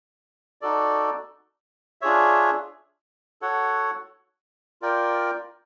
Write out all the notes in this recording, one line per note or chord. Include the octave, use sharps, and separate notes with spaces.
D#4 F#4 A4 D5
D4 F4 G#4 C#5 E5
F#4 A4 C#5 F#5
F4 A#4 D5 G5